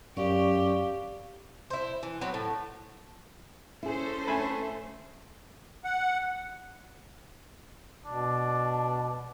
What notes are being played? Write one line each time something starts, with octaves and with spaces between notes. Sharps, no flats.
F#2 G4 D5 F5 C#6
E4 C5
E3
F#3 B3 C4
A2
C#4 E4 G#4 A4 C5
A3 G#5 B5
F#5
B2 D4